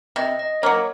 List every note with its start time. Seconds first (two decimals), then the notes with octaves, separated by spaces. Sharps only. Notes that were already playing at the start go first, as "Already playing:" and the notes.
0.16 C3 D#5
0.39 D#5
0.62 F#3 A#3 C#5